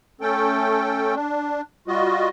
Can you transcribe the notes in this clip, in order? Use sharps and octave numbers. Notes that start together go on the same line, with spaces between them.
A3 C#4 A4 G5
D4
G3 F4 F#4 D#5